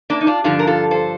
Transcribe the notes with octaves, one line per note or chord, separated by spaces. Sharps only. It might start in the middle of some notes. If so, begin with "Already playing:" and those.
A#3 D4
D#4
D4 F4
G2 D3 F3 D4 F4
A#4
F4 A4
A4 C5